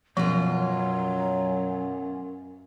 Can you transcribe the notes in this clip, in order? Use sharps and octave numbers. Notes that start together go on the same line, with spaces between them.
F#2 B2 F3 F#3 F4